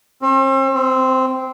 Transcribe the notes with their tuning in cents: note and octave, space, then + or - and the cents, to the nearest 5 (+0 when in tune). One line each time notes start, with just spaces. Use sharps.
C4 +40
C4 -10